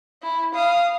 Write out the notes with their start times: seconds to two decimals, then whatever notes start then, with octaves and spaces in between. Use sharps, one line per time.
0.23 E4
0.55 F5 D#6